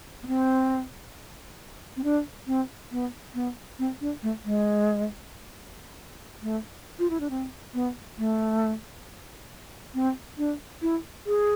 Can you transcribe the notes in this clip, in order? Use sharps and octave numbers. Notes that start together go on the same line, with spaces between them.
B3
C4
C4
D4
C4
B3
B3
C4
D4
A3
G#3
A3
F4
E4
D4
C4
B3
A3
C4
D4
E4
G#4